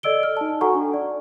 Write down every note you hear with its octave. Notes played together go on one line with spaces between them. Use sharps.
A4 D5 D#5 E6 D7 G7
F6
D#4 A5
F#4 A4 F#5 G#5 A#5 C#6
D4
D5